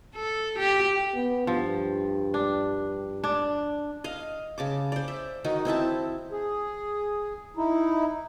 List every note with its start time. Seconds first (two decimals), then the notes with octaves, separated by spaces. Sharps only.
0.16 A4
0.59 G4
1.15 B3
1.47 G2 F3
2.34 D4
3.24 D4
4.04 D#5 F5
4.58 C#3 A5 D6
4.92 C5 D5
5.08 E5
5.44 D#3 D#4 F#4
5.65 C4 E4 E5 A5
6.32 G#4
7.57 D#4 E4